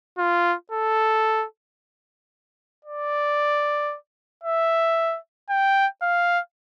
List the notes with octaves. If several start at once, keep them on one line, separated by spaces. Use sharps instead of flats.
F4
A4
D5
E5
G5
F5